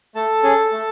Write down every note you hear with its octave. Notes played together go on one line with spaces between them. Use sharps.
A3 A4 A5
C#4 G#4
A3